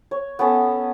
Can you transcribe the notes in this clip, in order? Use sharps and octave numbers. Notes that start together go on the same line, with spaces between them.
C#5
B3 C#4 A4